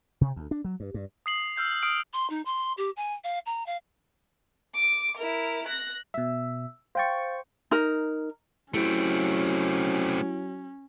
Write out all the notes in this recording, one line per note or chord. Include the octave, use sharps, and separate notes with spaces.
C3
D2
D4
F#3
G2
G2
D#6 C7 F#7
E6 F6 G6 C7
D#6 F6 C7 D7
C6
D#4
C6
G4
G#5
F5
A#5
F5
D6
E4 A#4
F#6 A#6
B2 E5 E6
C5 F5 G5 C#6 A6
D#4 A#4
F#3 A3 C4 C#4 E4 G4 D7